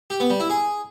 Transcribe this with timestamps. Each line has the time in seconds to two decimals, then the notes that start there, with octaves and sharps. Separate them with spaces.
0.10 G4
0.20 B3
0.30 G3
0.40 E4
0.50 G#4